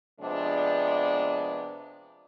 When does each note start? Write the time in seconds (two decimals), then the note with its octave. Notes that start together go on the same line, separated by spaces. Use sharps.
0.20 C3 F3 G#3 B3 D4